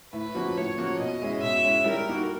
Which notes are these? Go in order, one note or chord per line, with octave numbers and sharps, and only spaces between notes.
A2 B4
F3 A#3 C#4 F#4
A2 C#5
F3 A#3 C#4 F#4
B2 D#5
G#3 C#4 E4
B2 E5
G#3 C#4 E4
G3 A#4
A#3 D#4 F#4